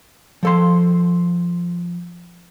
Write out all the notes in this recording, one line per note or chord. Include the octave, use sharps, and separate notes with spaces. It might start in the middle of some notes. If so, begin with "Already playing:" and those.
F3 A4 C6